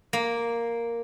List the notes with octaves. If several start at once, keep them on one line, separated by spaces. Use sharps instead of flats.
A#3